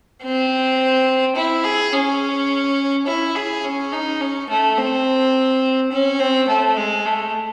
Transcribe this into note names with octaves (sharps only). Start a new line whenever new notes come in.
C4
E4
G#4
C#4
E4
G#4
C#4
D#4
C#4
A3
C4
C#4
C4
A3
G#3
A3